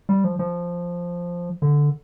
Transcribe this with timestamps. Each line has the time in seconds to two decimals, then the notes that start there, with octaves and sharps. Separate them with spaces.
0.09 G3
0.24 F3
0.39 F3
1.62 D3